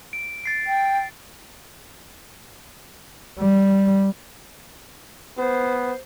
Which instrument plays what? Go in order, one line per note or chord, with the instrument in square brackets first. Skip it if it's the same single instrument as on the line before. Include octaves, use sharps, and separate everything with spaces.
[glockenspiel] D7
A6 C7 D7
[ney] G5
[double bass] G3
[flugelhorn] B3 [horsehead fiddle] C5